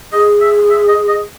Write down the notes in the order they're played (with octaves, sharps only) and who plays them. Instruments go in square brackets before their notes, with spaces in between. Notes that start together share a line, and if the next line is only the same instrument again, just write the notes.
[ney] G#4 [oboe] D#5
[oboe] E5
E5
D#5
D#5